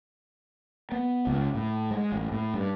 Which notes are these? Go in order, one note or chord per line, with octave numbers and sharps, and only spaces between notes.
B3
C#2
A2
G#3
A1
A2
G2